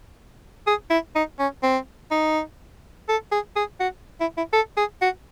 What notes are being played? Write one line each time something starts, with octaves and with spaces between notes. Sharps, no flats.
G#4
E4
D#4
C#4
C4
D#4
A4
G#4
G#4
F#4
E4
E4
A4
G#4
F#4